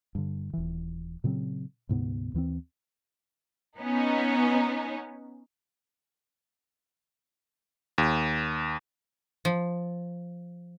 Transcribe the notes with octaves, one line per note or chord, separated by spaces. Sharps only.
G2 D3
D#1 E3
A#2 C#3 F#3 C4
D2 G#2 C3 B3
D#2 E3 B3 C4
B3 C#4 D#4
D#2
F3